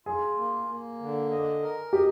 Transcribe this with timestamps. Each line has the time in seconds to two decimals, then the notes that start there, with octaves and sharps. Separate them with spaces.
0.06 F4 G#4
0.37 A#3
0.68 A#3
1.00 D3
1.30 D#5
1.63 A#4
1.93 G4 D#5